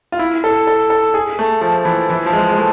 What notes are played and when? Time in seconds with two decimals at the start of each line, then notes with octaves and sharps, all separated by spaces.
0.12 F4
0.19 E4
0.44 A4
0.67 A4
0.90 A4
1.14 G#4
1.39 A3
1.61 F3
1.85 E3
2.10 E3
2.26 F3
2.33 G#3
2.49 G#3
2.57 A3